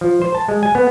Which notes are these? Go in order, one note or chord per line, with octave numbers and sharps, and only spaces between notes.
F3
C5
A5
G#3
G#5
B3